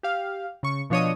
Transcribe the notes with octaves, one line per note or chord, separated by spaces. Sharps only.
G4 F5
C#3 C#6
B2 F3 D4 C#5 D#5 D#6